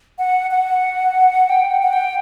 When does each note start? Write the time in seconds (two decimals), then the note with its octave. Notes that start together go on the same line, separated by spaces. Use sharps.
0.18 F#5
0.51 F#5
1.49 G5
1.71 F#5
1.83 F#5
1.93 G5